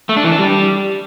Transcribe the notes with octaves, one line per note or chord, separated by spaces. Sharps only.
A3
D4
E3
D4
G3